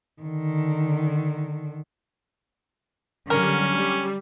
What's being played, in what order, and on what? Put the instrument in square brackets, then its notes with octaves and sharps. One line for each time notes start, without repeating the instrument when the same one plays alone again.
[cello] D3 D#3
[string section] D3 F#3 G3 [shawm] C#4 [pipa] A#4
[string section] G3